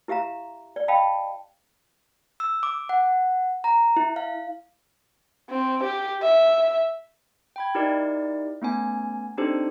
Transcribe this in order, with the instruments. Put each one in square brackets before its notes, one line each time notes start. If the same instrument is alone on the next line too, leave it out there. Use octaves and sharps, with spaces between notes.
[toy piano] E4 G4 E5 F5 A#5
D5
D#5 F5 G5 A5 B5
[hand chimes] E6
D6
F#5
A#5
E4
F5
[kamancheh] C4
G4
E5
[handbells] G5 B5 G#6
D#4 E4 G4 A#4 D5
A3 B3 C#4 G#5
C4 D4 D#4 G4 A4 C5